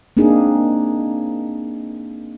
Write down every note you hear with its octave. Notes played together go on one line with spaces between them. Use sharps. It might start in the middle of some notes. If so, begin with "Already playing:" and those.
A#3 C4 D4 D#4 G#4